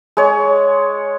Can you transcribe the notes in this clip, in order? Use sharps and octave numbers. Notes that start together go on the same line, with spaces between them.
G#3 C#5